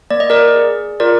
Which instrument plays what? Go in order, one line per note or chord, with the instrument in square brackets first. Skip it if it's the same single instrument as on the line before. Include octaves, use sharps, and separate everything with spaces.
[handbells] A#3 D5
D#5
A#4 D5
G#4
F4 A#4 D5